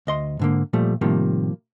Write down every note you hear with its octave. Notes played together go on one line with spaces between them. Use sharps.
D2 D#5 C6
G#2 D3 A#3
A#2 F3 G3 A3
A2 C3 D#3 F3 G3 A#3